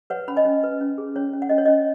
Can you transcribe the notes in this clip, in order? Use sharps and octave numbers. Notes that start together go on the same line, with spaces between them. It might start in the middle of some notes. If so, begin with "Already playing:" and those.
B4 C#5 F#5
C#4 B5
D#5 G#5
C#4
B4
C#4
G#4
C#4 C#5
C#4
F#5
C#4 D#5
C#5
C#4 D#5